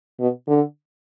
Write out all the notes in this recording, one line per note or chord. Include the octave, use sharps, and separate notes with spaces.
B2
D3